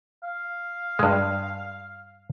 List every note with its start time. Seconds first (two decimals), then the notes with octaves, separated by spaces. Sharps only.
0.24 F5
0.99 G2 G#3